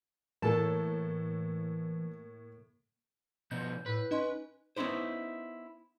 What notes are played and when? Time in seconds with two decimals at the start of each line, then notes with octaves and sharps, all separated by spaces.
0.42 A2 E3 A#3 A4 A#4 A5
3.51 B2 F3 B3 G6
3.86 A2 B4
4.11 C#4 D#4 D#5 C6
4.76 B3 C#4 D#4 E4 C5